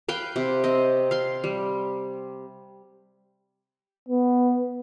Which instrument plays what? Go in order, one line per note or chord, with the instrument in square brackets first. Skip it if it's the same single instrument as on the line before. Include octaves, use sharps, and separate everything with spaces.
[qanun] B4 F5 G5
C3
C4 D#5
F5 C6
G3
[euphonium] B3